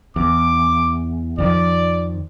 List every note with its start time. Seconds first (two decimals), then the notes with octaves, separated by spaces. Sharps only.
0.16 E2 D6
1.38 F2 D#3 F3 D5